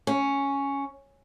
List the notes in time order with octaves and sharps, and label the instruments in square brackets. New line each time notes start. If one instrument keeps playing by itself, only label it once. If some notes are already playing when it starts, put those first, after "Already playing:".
[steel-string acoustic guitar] C#4